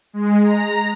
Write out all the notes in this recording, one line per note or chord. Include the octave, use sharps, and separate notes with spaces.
G#3
A#5